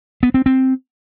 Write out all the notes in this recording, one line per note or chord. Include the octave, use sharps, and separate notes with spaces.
B3
C4
C4